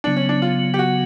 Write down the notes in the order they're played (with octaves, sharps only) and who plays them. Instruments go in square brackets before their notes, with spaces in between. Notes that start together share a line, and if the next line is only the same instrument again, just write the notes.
[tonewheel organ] C#3 F#3 B3 [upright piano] D4
[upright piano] C#4
D4
F4
G4
F#4